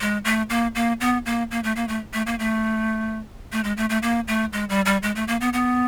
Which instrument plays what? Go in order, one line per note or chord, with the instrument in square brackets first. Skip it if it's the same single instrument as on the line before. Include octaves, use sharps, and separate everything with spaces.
[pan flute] G#3
A3
A#3
A#3
B3
A#3
A#3
A3
A#3
A3
A3
A#3
A3
A3
G#3
A3
A3
A#3
A3
G#3
G3
G3
G#3
A3
A#3
B3
B3